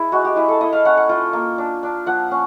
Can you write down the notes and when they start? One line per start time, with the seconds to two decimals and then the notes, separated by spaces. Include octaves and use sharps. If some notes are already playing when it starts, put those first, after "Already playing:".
Already playing: E4 G#4
0.12 G#3 F#4
0.25 G4
0.36 E4 G#4
0.48 A4
0.60 E4 D#5
0.73 F5
0.85 C#4 F#5
0.97 F#5
1.09 F4 G5
1.33 A#3
1.58 D4
1.83 D4
2.06 F3 F#5
2.31 C#4